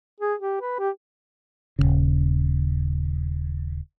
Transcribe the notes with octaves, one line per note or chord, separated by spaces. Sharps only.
G#4
G4
B4
G4
D#1 A#1 C#3